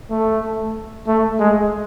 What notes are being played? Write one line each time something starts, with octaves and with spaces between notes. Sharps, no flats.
A3
A3
G#3